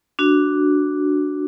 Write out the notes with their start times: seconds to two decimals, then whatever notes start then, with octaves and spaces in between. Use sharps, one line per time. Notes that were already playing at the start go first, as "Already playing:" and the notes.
0.19 D4 F#4